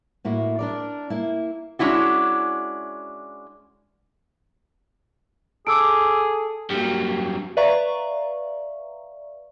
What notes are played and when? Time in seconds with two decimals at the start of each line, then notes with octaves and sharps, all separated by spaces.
0.25 A2 A#3 E4 F#4
0.59 D4 A#4 D5
1.10 A#3 E4
1.79 G#3 C#4 D4 E4 F#4
5.67 G#4 A4 D6 E6 D7
6.70 G2 F#3 A#3 G4
7.57 B4 D5 E5 F5 A#5 C#6